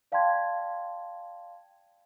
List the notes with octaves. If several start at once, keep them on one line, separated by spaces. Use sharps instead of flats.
D5 F5 G5 A5 C6 G#6